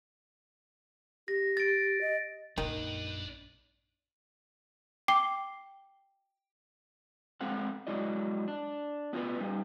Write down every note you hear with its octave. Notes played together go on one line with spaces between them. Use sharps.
G4 A#6
A6 D7
D#5
A#1 F#2 D#3 D4 B4
G5 D6 C7 G7
G#3 C4 A4 F5 F#5
F#3 G#3 E4 D5 D#5
D4
B3 F4 G#4 A#4 B4
G3 D#4